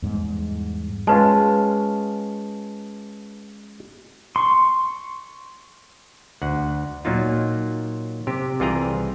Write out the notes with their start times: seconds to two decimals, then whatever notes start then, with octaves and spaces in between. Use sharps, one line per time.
0.02 E2 G#2 G3
1.07 G#3 C#4 F4 B4 A5
4.36 C6 C#6
6.42 D2 F#5
7.05 A#2 F#3 A#3 D#4 F4
8.27 C3 G4
8.60 C2 E3 F4 G#4 G5 A#5